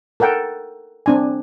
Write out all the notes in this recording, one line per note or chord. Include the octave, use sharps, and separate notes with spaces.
A4 A#4 F#5 G5
C4 D4 G#5